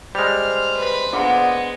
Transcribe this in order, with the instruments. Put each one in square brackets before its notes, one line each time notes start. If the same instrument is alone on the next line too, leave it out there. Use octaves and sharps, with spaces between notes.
[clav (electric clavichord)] G3 G#3 [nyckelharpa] C5 [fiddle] F6
[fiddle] B4 B5
[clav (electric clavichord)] A#2 [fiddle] G#3 B3 [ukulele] D4 F#5